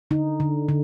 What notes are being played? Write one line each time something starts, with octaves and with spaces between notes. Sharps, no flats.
D3 D#4
D3
D3